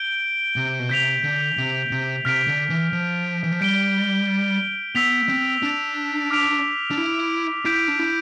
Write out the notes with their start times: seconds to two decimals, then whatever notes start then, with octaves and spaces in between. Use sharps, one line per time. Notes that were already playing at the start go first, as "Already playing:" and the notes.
Already playing: G6 D7 G7
0.56 C3
0.79 B2
0.89 C3 G6 B6 D7 F7
1.23 D3
1.57 C3
1.91 C3
2.25 C3 F6 B6 D7
2.47 D3
2.70 E3
2.93 F3
3.44 E3
3.52 F3
3.60 G3 G6 D7 G7
4.95 B3 E6 B6 F7
5.29 C4
5.63 D4
6.30 D6 F6 B6 D7 F7
6.91 D4
6.98 E4
7.65 E4 G6 B6 D7
7.88 D4
7.99 E4